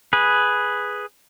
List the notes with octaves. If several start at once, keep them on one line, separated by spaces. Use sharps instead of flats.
G#4 B4